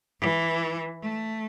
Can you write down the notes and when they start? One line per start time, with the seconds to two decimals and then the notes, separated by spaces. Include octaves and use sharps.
0.20 E3
1.02 A3